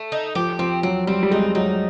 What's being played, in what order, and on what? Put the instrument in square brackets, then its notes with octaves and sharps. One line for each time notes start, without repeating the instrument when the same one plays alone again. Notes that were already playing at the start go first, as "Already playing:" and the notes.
Already playing: [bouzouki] A3
D#4
[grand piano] F3 [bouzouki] G4
[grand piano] F3 [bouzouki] C4
[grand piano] F#3 [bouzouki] C4
[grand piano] G3 [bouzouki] C4
[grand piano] G3
[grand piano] G#3 [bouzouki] D#4
[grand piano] F#3 [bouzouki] D#4